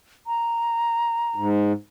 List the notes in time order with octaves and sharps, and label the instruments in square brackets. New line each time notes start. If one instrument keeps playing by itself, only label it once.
[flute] A#5
[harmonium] G#2